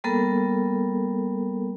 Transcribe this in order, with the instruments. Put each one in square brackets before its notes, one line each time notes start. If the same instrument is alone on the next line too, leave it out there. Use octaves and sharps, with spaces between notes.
[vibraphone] G3 A#3 B3 A4 A#4